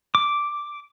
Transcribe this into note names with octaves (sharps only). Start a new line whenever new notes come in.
D6